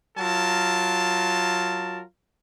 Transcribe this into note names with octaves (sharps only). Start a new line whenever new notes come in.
F#3 F4 A#4 A5